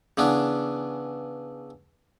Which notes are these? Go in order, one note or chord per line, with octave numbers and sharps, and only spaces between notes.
C#3 E3 B3 D4